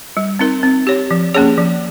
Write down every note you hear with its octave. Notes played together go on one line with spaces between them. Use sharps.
G3
C4 D#4 A#4
C4
G4 C#5
F3
A#3 C#4 G#4 C#5
F3